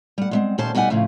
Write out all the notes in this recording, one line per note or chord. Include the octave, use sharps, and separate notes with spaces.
G3 F#5
G#3 A3 C4
A#2 D#3 C#4 G4 C5 A5
B2 G3 D#4 F4 F#5 G#5
F2 A2 C#3 F3